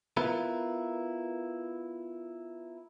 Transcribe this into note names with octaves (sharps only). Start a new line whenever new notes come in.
B3 E4 F4 A#4 B4